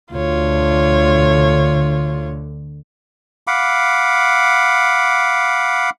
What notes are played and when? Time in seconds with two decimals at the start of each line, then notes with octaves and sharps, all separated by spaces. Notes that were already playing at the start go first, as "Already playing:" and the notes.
0.13 D2 D3 F4 C#5
3.47 F5 F#5 B5 D6